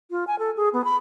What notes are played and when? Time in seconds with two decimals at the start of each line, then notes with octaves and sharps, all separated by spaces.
0.11 F4
0.27 G#5
0.39 A4
0.57 G#4
0.73 B3
0.84 B5